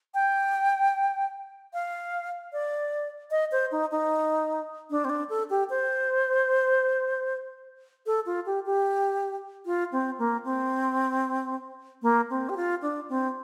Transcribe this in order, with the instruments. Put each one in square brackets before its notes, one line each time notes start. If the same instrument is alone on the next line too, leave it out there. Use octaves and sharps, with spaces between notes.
[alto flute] G5
F5
D5
D#5
C5
D#4
D#4
D4
C4
D4
A4
G4
C5
A4
F4
G4
G4
F4
C4
A#3
C4
A#3
C4
G4
F4
D4
C4